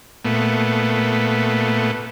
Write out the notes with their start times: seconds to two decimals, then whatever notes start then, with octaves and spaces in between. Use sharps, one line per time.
0.25 A#2 A3 B3